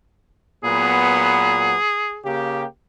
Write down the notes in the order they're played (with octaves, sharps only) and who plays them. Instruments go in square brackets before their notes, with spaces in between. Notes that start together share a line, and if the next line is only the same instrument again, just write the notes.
[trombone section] A#2 F#3 B3 [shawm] G#4
[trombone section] C#3 A#3 G4